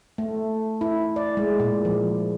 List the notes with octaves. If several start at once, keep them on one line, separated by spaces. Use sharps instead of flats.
A3
E4
D5
G#3
A#2
F3